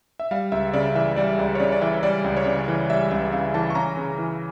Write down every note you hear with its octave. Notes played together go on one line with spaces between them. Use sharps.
E5
G3 F5
C#2 E5
C#3 D5
E3 E5
G3 D5
C#2 D5
C#5
C#3 D5
D5
E3 E5
G3 D5
C#2
C#5
C#3 D5
E3
G3 E5
C#2 E5
C#3 F5
E3 A5
C#6
C#4 A#5
C#3
E3